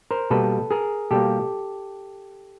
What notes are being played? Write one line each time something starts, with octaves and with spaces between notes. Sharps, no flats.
A#4 C5
B2 G3 A#3 A4 B4
G#4 A#4
B2 G3 A#3 G4 A4